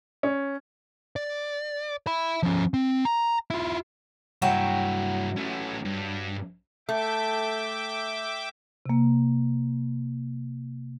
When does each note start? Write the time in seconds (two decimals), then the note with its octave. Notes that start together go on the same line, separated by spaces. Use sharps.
0.23 C#4
1.16 D5
2.07 E5 B5
2.43 F3 C#4
2.74 C4
3.05 A#5
3.50 E4 F4
4.42 G2 F#3 E4 E5 G5
5.36 A3 C#4
5.85 G2
6.89 A3 E5 G5 D6
8.86 C3 A#3